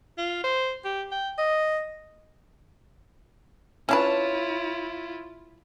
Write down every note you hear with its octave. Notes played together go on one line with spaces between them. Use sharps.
F4
C5
G4
G5
D#5
C#4 D4 E4 F4 B4 C#5 A5